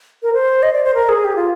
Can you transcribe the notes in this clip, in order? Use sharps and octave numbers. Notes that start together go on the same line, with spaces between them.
A#4
C5
D#5
D5
C5
A#4
G#4
G4
F4